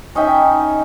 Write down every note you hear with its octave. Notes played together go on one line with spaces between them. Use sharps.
C#4 D#4 E5 G5